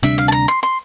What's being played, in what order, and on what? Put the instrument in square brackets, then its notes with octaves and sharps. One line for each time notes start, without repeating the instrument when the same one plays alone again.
[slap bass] D2 C3 G3 D4 [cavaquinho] E5
[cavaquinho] F5
A5
A#5
C6
C6